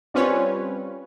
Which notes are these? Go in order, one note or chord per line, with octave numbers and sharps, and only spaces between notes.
G3 C4 C#4 F4 B4 C#5